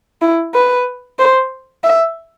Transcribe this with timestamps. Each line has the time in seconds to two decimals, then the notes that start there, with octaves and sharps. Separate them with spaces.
0.22 E4
0.54 B4
1.19 C5
1.83 E5